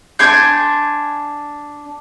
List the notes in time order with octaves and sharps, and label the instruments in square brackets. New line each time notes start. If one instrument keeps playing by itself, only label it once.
[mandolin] D4 G#5 C6 G6